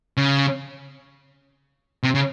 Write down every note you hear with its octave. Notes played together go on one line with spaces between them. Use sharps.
C#3
C3
C#3